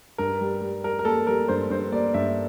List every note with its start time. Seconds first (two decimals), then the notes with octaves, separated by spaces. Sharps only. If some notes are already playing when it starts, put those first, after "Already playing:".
0.18 G2 A#4
0.41 G3
0.61 G3
0.84 G3 A#4
0.99 A#4
1.05 A#3 A4
1.27 G3 A#4
1.48 G2 C5
1.70 G2 C5
1.92 A#3 D5
2.14 G2 E5